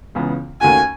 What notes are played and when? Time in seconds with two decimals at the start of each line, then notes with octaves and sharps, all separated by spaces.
0.15 C#2 C#3 E3 B3
0.61 D#2 D#3 A3 C#4 F#4 G#5